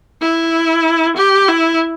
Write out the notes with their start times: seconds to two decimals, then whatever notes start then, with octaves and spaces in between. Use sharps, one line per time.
0.21 E4
1.16 G4
1.48 E4